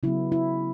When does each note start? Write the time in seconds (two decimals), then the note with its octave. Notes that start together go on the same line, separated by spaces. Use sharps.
0.03 C#3 F#3 B3 E4
0.32 E4